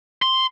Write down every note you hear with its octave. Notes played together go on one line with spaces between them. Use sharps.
C6